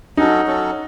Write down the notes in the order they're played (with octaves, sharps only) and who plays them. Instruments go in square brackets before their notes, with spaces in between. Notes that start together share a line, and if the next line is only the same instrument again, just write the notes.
[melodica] F#3 C#4 F#4 A4 [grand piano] D#4
[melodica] F#3 C#4 F#4 A4